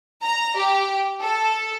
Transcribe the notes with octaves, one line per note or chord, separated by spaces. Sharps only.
A#5
G4
A4